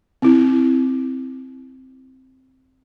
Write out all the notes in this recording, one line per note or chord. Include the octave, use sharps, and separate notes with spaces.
C4 E4